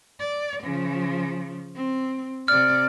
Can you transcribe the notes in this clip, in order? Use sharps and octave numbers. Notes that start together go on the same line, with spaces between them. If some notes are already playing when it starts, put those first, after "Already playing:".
D5
C#3 F3
C4
C3 D5 F6